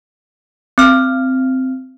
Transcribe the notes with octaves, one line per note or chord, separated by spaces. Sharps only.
C4 F6